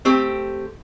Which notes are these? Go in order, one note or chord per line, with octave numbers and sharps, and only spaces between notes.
A3 C4 G4